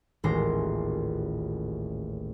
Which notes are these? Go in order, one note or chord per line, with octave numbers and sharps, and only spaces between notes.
D#1 A1 G#3 C6 D6 A#6